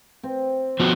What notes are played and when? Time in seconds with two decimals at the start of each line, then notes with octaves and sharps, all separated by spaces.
0.23 C4
0.80 F3 B3 F#4